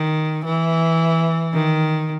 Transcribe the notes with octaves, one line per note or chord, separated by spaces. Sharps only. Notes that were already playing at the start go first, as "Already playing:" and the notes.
Already playing: D#3
E3
D#3